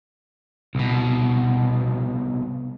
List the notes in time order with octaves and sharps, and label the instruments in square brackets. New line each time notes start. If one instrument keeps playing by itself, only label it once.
[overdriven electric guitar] C2 B2